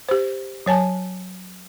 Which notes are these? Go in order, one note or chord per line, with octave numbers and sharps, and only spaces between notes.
G4 C5
F#3 C#5 G#5 A5